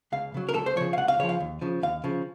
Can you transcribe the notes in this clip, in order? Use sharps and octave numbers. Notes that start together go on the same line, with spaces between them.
C#2 F5
C#3 F#3
A#4
C#2 A4
C5
C#3 F3 C#5
F5
C#2 F#5
F5
C#3 F3 C#5
F5
D#2
C#3 F3
D#2 F5
C#3 F3